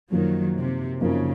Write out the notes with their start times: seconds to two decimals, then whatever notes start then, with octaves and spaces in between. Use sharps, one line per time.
0.12 F#2 D#3 F3 F#3 A#3 D#4 A#4
0.57 C3
1.01 F#2 C#3 F3 A#3 D#4 A#4